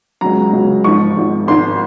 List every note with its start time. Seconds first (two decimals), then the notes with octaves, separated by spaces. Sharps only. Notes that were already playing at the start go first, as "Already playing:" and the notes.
0.21 C#2 C#3 F#3 A#5
0.53 C#2 C#3 F#3
0.84 G#1 G#2 F3 C#6
1.16 G#1 G#2 F3
1.48 G#1 G#2 F3 C6